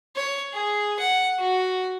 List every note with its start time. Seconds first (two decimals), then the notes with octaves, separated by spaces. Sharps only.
0.16 C#5
0.53 G#4
0.99 F#5
1.39 F#4